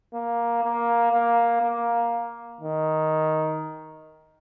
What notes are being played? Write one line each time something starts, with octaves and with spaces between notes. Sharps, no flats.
A#3
A#3
A#3
A#3
D#3